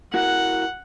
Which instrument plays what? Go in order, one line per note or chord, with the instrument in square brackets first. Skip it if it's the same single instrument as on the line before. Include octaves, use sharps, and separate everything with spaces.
[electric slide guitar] E4 F#4 A#4 [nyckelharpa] F#5